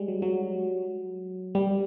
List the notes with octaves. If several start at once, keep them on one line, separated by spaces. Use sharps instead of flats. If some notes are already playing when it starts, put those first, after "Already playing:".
Already playing: G3 G#3
F#3
F#3
G3